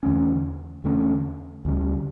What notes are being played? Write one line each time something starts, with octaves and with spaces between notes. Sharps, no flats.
E2 D3 A3 C#4
E2 D3 A3 C#4
D2 C#3 G3